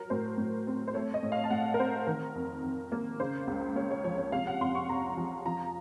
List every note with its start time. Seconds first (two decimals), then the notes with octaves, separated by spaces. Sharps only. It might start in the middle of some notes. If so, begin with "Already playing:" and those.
Already playing: F#3 A#4
0.10 A2 C5
0.38 A2
0.67 C4
0.88 C5
0.94 A3 C#5
1.14 D#5
1.23 A2
1.32 F5
1.44 A5
1.51 A2 F#5
1.74 A#4
1.79 C4 C5
2.07 D#3 A#4
2.35 F2
2.64 F2
2.92 A#3
3.20 C#3 C5
3.47 C#2
3.76 A#3 C#5
3.91 C#5
4.04 F3 C#5
4.18 C#5
4.32 C3 F5
4.47 F#5
4.61 F2 C6
4.75 C#6
4.89 F2 A#5
5.17 F3
5.45 F3 A#5